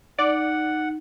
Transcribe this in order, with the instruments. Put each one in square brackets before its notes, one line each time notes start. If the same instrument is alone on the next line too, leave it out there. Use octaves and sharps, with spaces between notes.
[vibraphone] D#4 [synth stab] D5 [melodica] F#5